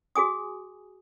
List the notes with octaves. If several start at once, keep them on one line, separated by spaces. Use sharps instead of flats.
F#4 G#4 G#5 D#6